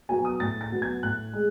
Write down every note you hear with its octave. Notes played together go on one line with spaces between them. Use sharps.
F#3 B3 G#5
D#6
A2 A6
A6
F#3 B3
G#6
A2 F#6
G#3